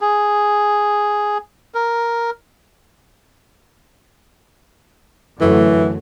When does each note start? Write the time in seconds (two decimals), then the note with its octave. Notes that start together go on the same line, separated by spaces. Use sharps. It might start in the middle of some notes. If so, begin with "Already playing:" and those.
0.01 G#4
1.75 A#4
5.41 F#2 D3 E3 A3